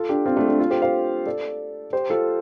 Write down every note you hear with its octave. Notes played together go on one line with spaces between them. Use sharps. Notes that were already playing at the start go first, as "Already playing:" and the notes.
Already playing: F4 A4
D4 G4
C4 F4
A3 D4
D4 G4
F4 A4
G4 C5
C5 F5
A4 D5
G4 C5
F4 A4